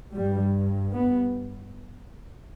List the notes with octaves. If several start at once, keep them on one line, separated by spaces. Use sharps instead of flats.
G2 G3
B3